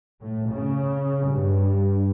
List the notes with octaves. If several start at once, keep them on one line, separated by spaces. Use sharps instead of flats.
A2
C#3
G2